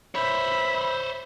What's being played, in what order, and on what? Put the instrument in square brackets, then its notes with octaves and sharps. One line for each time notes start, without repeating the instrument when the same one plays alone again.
[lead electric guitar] C5 C#5 [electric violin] E5 B5